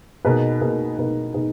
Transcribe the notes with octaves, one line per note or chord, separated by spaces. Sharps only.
B2 A#3 D#4 G#4 B4
B2 A#3 D#4 G#4 B4
B2 A#3 D#4 G#4 B4
B2 A#3 D#4 G#4 B4